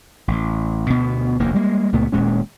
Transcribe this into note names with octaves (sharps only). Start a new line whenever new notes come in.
A1
D2 B2 B3
F1 D2 A#3
G3 G#3 A#3
C#2 A#2 A3 B3
D#1 A#2 G#3 C#4